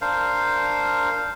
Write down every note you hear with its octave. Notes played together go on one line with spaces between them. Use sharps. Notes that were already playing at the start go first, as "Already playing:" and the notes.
D4 A#4 C5 F5